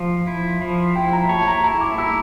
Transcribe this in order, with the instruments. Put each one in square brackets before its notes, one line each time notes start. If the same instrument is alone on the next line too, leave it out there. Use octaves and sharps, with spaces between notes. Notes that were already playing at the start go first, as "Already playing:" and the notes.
Already playing: [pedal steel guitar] F3 [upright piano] F5
[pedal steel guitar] E4
F3
[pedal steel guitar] E4 [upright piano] G5
[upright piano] A#5
[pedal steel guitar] C#5 [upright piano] A5
[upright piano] A#5
[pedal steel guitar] E4 [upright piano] A#5
[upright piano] D6
[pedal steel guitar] E4 [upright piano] E6